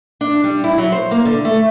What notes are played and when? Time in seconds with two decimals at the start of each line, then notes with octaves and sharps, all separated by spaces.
0.21 D4
0.44 G3
0.64 E4
0.78 F#3
0.92 C5
1.11 A#3
1.25 D3
1.45 A3